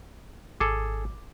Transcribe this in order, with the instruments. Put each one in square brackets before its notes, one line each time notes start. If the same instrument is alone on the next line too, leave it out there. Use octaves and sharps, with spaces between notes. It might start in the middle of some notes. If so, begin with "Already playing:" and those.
[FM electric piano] G#1 [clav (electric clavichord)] G#4 A4 [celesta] D6